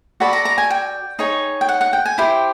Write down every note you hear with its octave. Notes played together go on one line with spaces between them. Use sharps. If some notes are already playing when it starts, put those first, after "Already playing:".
F#4 A4 D5 B5
A#5
A#5
G#5
G5
D#4 G#4 C#5
G5
F#5
F#5
G5
G#5
E4 G4 C5 G5